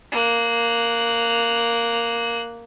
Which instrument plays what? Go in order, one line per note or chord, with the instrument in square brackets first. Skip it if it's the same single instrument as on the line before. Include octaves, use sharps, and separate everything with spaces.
[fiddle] A#3 F#6